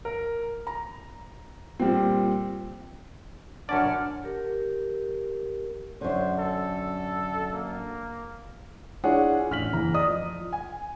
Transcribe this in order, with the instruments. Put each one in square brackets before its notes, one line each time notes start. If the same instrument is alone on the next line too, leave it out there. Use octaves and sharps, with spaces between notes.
[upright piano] A#4
[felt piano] A#5
A#2 G3 C4
[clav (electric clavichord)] F#2 C#4 D5 [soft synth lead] D4 [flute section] F#5 A5 F6
[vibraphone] G4 A#4
[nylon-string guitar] F#2 D3 [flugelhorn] C5
[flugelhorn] A4
A#3
[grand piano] D4 E4 F4 G#4 C#5 F#5
A1 F6 B6 F#7
F#1 E3 A#5
D5 D#5 D#6
F3
G#5